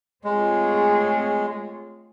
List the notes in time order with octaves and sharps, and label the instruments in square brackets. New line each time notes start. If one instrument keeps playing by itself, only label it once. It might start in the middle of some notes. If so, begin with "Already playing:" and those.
[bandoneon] G#3 [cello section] A3 C4 F4 G#4 C#5